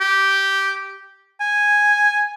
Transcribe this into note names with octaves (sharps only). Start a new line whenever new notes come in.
G4
G#5